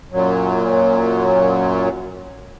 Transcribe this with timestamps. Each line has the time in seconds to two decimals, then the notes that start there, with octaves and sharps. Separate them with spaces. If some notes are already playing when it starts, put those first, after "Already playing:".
0.12 F#2 A#2 F#3